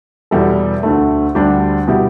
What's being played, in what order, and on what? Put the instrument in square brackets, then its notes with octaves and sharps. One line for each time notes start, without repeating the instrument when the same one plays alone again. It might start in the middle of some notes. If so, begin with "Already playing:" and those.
[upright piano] E2 B2 G3 E4 A4
D2 D3 A3
D2 D3 G3 D4 G4
B2 G3 E4 G4